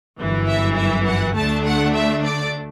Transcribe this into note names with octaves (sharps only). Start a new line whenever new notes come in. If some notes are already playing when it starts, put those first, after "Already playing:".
G1 F#2 E3
E5
E5
F#5
D2 D3 A3 D4 A5
F#5
E5
D5